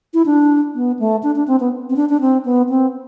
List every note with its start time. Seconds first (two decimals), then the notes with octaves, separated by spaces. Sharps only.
0.14 E4
0.26 D4
0.75 B3
0.99 A3
1.23 D4
1.36 D4
1.48 C4
1.60 B3
1.90 C4
1.96 D4
2.09 D4
2.21 C4
2.45 B3
2.69 C4